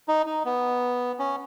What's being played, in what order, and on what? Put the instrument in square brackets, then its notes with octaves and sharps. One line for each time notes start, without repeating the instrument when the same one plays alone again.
[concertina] D#4
D#4
B3
C#4